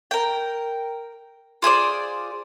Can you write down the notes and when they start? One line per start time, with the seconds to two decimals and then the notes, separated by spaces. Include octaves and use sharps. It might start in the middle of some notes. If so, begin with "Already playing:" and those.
0.11 A#4 G5
1.62 F4 G#4 C5 D5